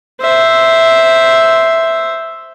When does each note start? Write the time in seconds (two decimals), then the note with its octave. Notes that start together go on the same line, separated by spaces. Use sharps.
0.21 C5 E5